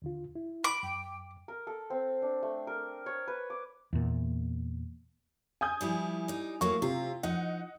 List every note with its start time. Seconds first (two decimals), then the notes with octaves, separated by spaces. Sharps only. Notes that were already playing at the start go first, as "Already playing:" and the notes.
0.02 D#2 D3 F4
0.35 E4
0.64 B5 D6
0.83 F#2 G5
1.48 A#4
1.67 A4
1.90 C4
2.22 D4
2.43 A3
2.67 A#4
3.06 C#5
3.28 B4
3.50 D6
3.93 E2 A#2
5.61 G#5 D#6 G6
5.81 F3 G3 E4
6.28 G3 D#4
6.61 F#3 A3 A#3 C#6
6.82 C3 F4
7.23 F3 D#4 D#5 F#5